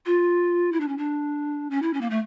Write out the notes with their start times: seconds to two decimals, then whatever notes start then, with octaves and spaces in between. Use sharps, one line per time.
0.06 F4
0.72 E4
0.80 D4
0.88 C#4
0.98 D4
1.70 C#4
1.82 E4
1.94 C#4
2.01 A#3
2.10 A3